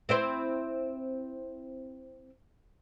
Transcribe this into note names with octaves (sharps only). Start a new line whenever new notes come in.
C4 E4 C5